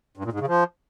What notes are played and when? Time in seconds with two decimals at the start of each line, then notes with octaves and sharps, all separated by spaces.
0.17 G2
0.25 A#2
0.32 G#2
0.40 C#3
0.47 F3